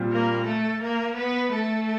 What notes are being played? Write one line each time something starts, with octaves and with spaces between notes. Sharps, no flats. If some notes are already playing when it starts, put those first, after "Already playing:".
Already playing: A#2 G3 C4 F4
A#3 A#4
A3 A4
A#3 A#4
B3 B4
A3 A4